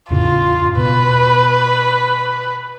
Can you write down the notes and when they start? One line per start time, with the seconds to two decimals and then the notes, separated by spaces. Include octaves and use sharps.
0.10 E2 A2 C#3 F4
0.77 B2 B4